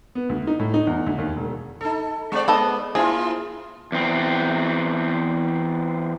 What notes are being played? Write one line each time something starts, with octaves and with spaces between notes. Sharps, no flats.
B3
D2
D#4
A2
D#4
E2
D2
D#2
E1
D#4 A4
G#3 C4 D5
B3 A4 D#5
A#3 E4 F4 G#4
E2 C4